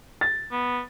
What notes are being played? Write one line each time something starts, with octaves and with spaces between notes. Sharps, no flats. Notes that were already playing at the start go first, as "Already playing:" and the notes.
A6
B3